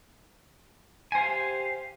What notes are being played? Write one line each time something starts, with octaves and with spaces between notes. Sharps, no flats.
G4 C5 F5 G#5